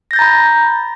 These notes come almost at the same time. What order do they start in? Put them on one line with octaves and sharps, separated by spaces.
A#6 G6 A6 A#5 B5